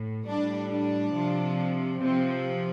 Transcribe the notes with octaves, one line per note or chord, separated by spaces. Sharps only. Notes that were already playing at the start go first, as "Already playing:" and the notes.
Already playing: A2
A2 G3 D4
D4
C3 F3
C3 F3 C4